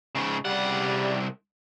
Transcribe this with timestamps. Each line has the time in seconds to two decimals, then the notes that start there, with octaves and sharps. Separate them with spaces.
0.15 G#2 C#3
0.45 C2 C#3 G3 F#5